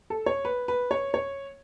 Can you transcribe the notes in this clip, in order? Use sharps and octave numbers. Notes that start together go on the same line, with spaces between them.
A4
C#5
B4
B4
C#5
C#5